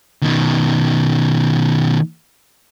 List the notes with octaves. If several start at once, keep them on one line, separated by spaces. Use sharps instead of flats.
B2 D#3